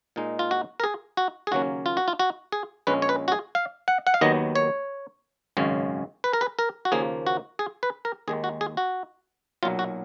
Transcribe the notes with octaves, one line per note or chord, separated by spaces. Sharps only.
A#2 G#3 D#4
F4
F#4
A#4
G#4
F#4
G#4
D#2 C#3 F#3 A#3 C#4 F#4
F4
F#4
F4
F#4
G#4
A#1 A#2 G#3 C#4 B4
C#5
B4
F#4
G#4
F5
F#5
F#5
F5
D#2 D#3 F#3 B3 D#5
C#5
G#1 F#2 C#3 G#3 C#4
B4
A#4
B4
A#4
F#4
D#2 C#3 F3 A#3 G#4
F#4
G#4
B4
A#4
D#2 D#3 G#3 G#4
F#4
G#4
F#4
B1 A#2 F#3 F4
F#4